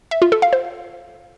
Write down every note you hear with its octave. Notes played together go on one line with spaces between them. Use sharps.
E5
F4
A4
F5
C5